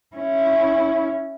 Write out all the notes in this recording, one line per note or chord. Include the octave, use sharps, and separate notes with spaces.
C#4 E4